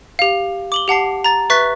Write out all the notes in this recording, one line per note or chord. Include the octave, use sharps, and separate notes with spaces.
G4 F5
D6 F#7 G7
G4 F#5 A5 C7
A#5 A6
B4 E5 C#6 F#6 A6 B6